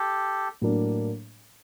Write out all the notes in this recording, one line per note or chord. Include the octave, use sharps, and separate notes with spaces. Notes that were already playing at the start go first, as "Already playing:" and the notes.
Already playing: G4 A4
A2 F#3 A#3 D4